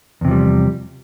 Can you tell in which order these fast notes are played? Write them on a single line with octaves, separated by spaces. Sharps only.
E2 C3 F3 G3